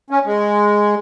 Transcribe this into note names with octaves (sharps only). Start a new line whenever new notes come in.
C#4
G#3